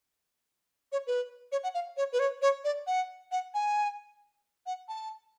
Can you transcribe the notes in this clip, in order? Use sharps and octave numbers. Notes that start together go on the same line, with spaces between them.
C#5
B4
C#5
F#5
F5
C#5
B4
C#5
C#5
D5
F#5
F#5
G#5
F#5
A5